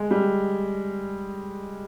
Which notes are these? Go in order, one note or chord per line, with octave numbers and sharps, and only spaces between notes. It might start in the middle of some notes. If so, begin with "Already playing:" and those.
Already playing: G#3
G3